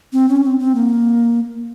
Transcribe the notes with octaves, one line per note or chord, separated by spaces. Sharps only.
C4
C#4
C4
C4
A#3